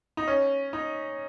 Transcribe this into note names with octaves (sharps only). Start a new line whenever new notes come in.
D#4
C#4
D#4